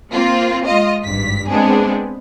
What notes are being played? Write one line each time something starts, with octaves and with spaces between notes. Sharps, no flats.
A#3 C4 F4
G#3 F4 D#5
G#1 G2 B6
G#3 B3 C4 D4 G#4